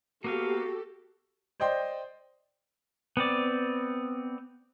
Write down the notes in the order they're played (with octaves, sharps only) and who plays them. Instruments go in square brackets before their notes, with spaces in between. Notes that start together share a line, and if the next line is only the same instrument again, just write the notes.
[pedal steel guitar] A#3 B3 F5 [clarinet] F#4 [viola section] G4 A4
[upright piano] C5 D5 D#5 G5 C6
[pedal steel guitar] B3 C4 D5